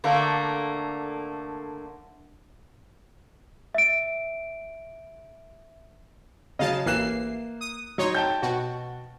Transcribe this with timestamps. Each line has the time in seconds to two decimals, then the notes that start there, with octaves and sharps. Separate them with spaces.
0.04 D3 A3 A#3
3.74 E5 D7
6.59 C#3 F#3 D#5 F5 A5
6.86 A1 E3 A#3 F#6 C7 E7
7.61 D#6
7.98 F#3 D#4 C#5 C6
8.15 G5 A5 G6
8.42 B2 F#4